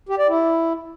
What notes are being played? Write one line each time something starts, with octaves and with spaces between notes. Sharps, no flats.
G4
D5
E4